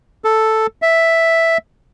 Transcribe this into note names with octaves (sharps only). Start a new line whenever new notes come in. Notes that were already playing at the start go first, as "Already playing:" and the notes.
A4
E5